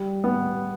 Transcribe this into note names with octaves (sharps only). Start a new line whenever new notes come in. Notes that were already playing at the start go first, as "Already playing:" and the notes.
Already playing: G3
B3